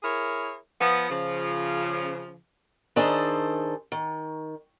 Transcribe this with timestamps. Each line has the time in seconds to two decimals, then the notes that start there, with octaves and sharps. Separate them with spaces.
0.03 E4 G#4 A#4 C#5
0.81 F3 B3
1.10 C#3 F3
2.96 D#3 D4 G#4 A4 C5
3.92 D#3